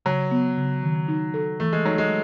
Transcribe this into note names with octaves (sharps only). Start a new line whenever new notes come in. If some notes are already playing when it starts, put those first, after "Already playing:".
C#3 F#3
B3
C#3
D#3
D#4
A4
E3 A3
G#3
F#3 D#4
G#3